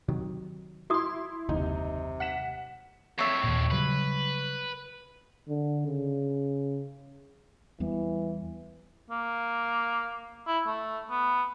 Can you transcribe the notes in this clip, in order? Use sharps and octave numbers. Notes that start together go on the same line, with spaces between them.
C3 D#3 F#3
E4 F#4 C6 D#6
F#1 D#2 C3 D#4
F#5 B6 E7
F2 A2 C#5 E5
D#2 A#2
C#3 F#3 G3 B4
D3
C#3
E2 E3 G3 B3
A#3
E4
A3
B3